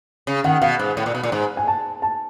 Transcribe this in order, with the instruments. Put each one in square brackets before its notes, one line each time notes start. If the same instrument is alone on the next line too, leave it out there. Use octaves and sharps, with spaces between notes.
[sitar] C#3
[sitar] D#3 [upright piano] F#5
[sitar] B2 [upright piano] F5
[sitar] G#2
A2
A#2
B2
A#2
G#2
[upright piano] G#5
A5
A5